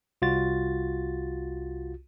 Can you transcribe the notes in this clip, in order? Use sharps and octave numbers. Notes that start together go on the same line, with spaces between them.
C2 F4 F#4 A6